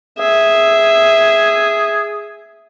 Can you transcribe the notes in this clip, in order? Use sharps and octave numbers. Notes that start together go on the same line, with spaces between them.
G#4 E5